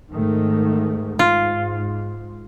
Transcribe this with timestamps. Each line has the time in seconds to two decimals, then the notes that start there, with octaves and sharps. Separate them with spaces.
0.13 G#2 D#3 A3
1.19 G#2 F4